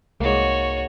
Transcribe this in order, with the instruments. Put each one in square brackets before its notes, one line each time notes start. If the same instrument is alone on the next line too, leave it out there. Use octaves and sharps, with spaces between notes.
[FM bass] C2 [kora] G#2 A#3 [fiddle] F#4 C#5